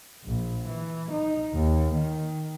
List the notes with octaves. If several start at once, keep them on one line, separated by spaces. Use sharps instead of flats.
A#1
E3
D#4
D#2
D#3